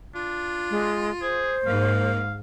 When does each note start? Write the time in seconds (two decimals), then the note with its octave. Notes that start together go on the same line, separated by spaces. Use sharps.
0.15 D4 F4
0.71 G#3
1.22 G#4 C5
1.67 G#2 A#3 F5